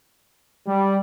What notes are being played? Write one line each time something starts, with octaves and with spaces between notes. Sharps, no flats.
G3